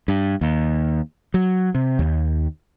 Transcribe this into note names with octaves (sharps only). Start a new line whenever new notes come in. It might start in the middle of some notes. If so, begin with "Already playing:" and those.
G2
D#2
F#3
C3
D#2